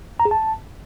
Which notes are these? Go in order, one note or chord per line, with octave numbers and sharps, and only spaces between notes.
A#5
G#4
A5